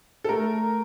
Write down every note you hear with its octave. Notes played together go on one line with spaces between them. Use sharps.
A4
A3 A#4